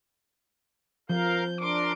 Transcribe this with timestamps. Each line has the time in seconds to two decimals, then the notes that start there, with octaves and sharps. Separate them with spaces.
1.10 F3 A#4 F5 G6
1.61 D4 A#4 C6 D6 D7